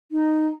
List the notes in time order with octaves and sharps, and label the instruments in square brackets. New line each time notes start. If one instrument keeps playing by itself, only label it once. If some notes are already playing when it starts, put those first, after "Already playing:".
[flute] D#4